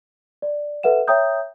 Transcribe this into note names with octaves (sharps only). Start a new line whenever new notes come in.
D5
A4 B4 E5 F#5 E7
C#5 E5 G5 A#5 D#6 G6